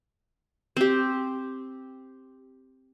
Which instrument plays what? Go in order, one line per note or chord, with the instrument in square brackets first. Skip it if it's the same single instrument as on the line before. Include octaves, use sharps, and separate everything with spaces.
[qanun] C4 G4